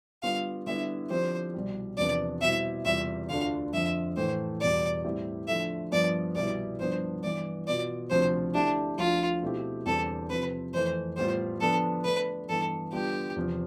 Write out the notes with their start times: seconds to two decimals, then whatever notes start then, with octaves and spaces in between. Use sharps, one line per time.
0.23 D3 G3 B3 F4 F5
0.66 D3 G3 B3 E4 E5
1.10 D3 F3 C4 G4 C5
1.54 C2 B2 G3
1.98 E2 C3 F3 B3 D4 D5
2.41 B2 G3 C4 E4 G4 E5
2.85 E2 C3 G3 C4 F4 E5
3.29 D2 D3 A3 D4 F4 F5
3.73 F2 D3 F3 E5
4.17 A2 E3 A3 C5
4.61 E2 B2 G3 D5
5.04 A2 G3 C4 E4 G4
5.48 D3 F3 A3 E5
5.92 G2 F3 B3 D5
6.36 C2 B2 G3 B3 E4 D5
6.79 G2 F3 B3 D4 C5
7.24 G2 E3 B3 D5
7.67 B2 B3 F4 D5
8.11 D2 C3 F3 C4 C5
8.54 D3 A3 D4 E4 G4
8.98 D2 D3 F3 F4
9.42 B2 A3 C4 E4 G4
9.86 E2 D3 G3 C4 G4 A4
10.29 C3 F3 C4 B4
10.73 F2 E3 A3 C5
11.17 A2 G3 B3 F4 C5
11.61 D3 F3 B3 D4 A4
12.04 D3 A3 D4 B4
12.48 G2 E3 B3 A4
12.92 D3 G3 B3 F4 G4
13.36 E2 C3 F3